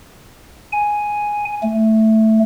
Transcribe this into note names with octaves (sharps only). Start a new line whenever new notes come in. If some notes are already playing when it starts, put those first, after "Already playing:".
G#5
A3